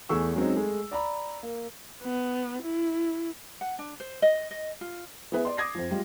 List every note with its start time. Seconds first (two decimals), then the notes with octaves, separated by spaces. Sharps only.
0.09 E2 A3 G#4 C#6 E6
0.36 F#3 G#3 C4 C#4 D#4
0.56 G#3 A3 G#4
0.91 D5 A#5 B5
1.43 A#3
2.02 B3
2.62 E4
3.61 F#5
3.79 D4
4.00 C5
4.22 D#5
4.51 D#5
4.81 F4
5.32 B3 E4 G#4 B4 E5
5.45 D5 C6
5.57 D6 D#6 G#6 A#6 C7
5.75 F2 F3
5.91 G3 G#3 F4